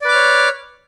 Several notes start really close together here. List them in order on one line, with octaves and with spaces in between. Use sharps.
D5 B4 D6 F6 C#5